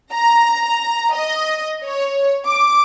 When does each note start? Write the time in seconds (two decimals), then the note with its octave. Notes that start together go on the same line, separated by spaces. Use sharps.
0.13 A#5
1.14 D#5
1.84 C#5
2.46 D6